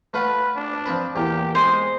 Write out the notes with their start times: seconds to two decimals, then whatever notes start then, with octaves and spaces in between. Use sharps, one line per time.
0.14 A3 F4 B4 F#5
0.56 D4
0.86 F3 C4 B4
1.16 E2 A#2 G4
1.55 G#3 C5 G#5